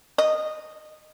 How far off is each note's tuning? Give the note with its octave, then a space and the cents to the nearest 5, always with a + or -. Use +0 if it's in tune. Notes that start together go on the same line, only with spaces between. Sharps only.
D#5 -15